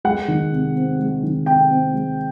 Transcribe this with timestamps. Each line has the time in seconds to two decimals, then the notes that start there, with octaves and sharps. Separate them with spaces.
0.04 G#3 F#5
0.28 D#3
0.52 C3
0.76 C4
0.99 G#3
1.23 D#3
1.46 C3 G5
1.70 C4
1.93 G#3